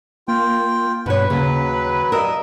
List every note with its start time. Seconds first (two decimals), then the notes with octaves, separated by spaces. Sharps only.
0.28 A#3 F4 G5
1.06 G2 B2 B4 C#5
1.30 D#2 C#3 F#3
2.12 G2 A#4 D#5 E6